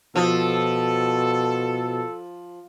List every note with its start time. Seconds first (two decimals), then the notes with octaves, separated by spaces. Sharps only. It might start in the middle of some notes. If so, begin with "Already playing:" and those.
0.16 B2 F3 A4